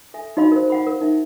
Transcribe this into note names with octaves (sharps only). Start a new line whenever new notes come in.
A4 E5 G#5
D#4 F#4 C#5 D#5 F5 B5
A#4 C5
F5 F#5 B5
A#4
D#4 E5